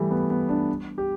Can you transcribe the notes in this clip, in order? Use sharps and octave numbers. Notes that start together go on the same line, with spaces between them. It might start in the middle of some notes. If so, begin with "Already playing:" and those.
Already playing: E3 G3 A3
B3
B3
D4
G4